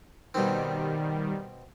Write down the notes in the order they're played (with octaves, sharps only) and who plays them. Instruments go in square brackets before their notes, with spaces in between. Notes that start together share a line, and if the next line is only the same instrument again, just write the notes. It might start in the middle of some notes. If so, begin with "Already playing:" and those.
[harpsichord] B2 C4 [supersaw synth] D#3 G3